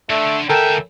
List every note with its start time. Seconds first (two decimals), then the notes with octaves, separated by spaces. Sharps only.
0.10 D3 A3
0.50 D2 A4 A#4 E5 G5 G#5